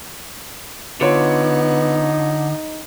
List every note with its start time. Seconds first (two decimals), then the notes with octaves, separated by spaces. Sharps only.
1.01 D3 B3 D#4 F4 C#5